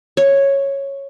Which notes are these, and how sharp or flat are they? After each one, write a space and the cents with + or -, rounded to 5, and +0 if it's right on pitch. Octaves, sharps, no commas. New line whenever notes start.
C#5 -5